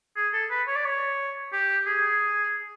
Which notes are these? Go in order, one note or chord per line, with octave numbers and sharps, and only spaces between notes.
G#4
A4
B4
C#5
D5
C#5
G4
G#4